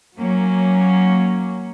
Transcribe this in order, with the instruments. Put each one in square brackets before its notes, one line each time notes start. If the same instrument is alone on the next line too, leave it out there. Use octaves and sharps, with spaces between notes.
[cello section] F#3 A#3 C#4